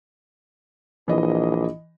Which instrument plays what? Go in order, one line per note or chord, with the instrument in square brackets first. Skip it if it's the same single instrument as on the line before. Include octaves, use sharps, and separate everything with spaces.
[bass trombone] A#1 [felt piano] E3 D#5